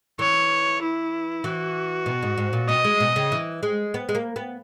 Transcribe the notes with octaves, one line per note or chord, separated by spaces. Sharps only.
E3 C#5
E4
E3 F#4
B2
G#2
G#2
A#2
B2 D#5
G#3
B2
C#3
E3
G#3
B3
G#3
A#3
B3